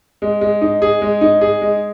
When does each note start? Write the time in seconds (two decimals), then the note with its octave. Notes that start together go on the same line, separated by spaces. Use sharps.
0.22 G#3
0.41 G#3
0.61 D#4
0.82 G#4
1.01 G#3
1.21 D#4
1.41 G#4
1.61 G#3